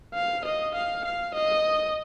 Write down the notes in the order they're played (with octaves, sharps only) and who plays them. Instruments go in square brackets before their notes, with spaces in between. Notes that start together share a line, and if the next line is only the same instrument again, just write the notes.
[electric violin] F5
D#5
F5
F5
D#5